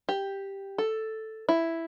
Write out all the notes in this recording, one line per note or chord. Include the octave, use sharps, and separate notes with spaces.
G4
A4
E4